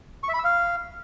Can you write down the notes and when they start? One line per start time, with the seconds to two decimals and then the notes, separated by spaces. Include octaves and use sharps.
0.23 C#6
0.29 E5
0.34 B5
0.39 E6
0.44 F5